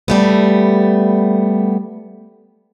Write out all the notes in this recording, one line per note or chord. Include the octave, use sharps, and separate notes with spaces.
G3 A3 B3